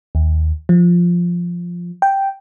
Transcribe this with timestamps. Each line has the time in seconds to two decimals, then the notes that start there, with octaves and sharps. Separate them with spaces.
0.15 D#2
0.69 F3
2.02 G5